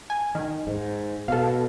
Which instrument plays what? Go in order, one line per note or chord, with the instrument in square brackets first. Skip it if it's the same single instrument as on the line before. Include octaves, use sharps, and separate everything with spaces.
[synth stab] G#5
D#3
[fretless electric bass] G#2
[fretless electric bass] B2 [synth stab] A4 F5